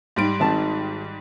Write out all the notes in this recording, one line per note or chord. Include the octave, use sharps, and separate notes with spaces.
G#2 G3 D7
G#1 D#3 A5